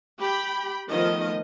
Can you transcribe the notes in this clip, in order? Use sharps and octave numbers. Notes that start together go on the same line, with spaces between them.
G4 G5 B5
D#3 F3 A3 B3 D#5